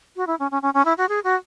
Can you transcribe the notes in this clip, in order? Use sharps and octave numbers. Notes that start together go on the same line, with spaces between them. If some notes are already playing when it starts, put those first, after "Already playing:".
F#4
E4
C#4
C#4
C#4
C#4
E4
F#4
G#4
F#4